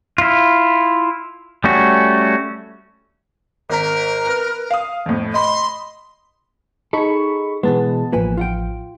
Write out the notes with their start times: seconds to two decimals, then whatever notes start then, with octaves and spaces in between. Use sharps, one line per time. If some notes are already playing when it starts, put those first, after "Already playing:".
0.18 E4 F4
1.64 G3 A3 C#4 F#4
3.70 G#1 A#4 A#5 B6
4.26 B4
4.71 F5 D#6
5.06 F2 A2
5.34 D#5 B5 C6
6.93 D#4 G#4 A4 B5 C#6
7.63 B2 E3 G#3 B3 A5
8.12 A1 F3 A#3 B4 G#5
8.37 F4 F#5 G5